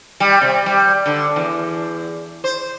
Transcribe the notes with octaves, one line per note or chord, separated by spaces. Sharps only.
G3
C3
G3
D3
E2
C5